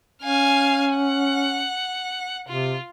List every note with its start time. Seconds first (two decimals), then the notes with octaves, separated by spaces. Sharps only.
0.23 C#4 F5 G#5
0.94 F#5
2.49 C3 F4